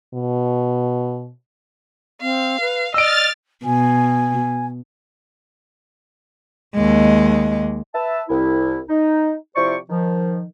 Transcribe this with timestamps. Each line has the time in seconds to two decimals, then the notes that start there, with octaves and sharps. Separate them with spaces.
0.14 B2
2.21 C4 F5
2.61 B4
2.94 D5 D#5 E6 F6 A6 D7
3.65 B2 G#5
6.75 D#2 G#3
7.94 B4 E5 A5
8.29 C2 E4
8.89 D#4
9.55 C3 F3 E4 C5 D5 C#6
9.89 D#3 F3